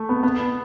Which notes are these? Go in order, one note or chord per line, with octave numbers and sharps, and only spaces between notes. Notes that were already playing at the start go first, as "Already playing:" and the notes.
Already playing: A3
B3
B3